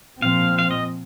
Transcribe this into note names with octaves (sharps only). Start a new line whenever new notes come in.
A#2 F3 C4 F5
F5
D#5